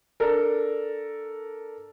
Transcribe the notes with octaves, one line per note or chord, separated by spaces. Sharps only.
D4 A4 A#4